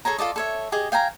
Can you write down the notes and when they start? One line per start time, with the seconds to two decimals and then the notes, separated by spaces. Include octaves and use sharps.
0.05 G#4 A4 C#5 A#5
0.18 F4 A4 D5 D#5
0.36 A4 C#5 E5
0.72 G4 G#4 D#5
0.92 F5 G5 G#5 A#5